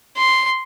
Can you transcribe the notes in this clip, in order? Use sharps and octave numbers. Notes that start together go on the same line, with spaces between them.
C6